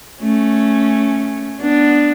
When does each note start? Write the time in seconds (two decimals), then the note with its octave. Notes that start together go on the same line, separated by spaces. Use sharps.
0.22 A3 C#4
1.61 B3 D4